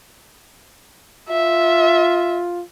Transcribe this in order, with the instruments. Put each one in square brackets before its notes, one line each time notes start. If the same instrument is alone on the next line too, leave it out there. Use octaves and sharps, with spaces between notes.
[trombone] F4 [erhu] E5